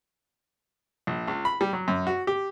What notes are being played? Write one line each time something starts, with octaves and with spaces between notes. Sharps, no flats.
A#1
C#2
B5
G3
F#3
F#2
F#4
G4